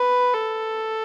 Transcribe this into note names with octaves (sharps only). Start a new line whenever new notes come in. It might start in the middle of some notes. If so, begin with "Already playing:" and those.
Already playing: B4
A4